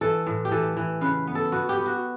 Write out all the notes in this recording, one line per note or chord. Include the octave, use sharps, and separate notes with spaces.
E3 A4
A2
G4
E3 A4
E3
C#3 B4
B3
A4
B3 F#4
G4
B3
F#4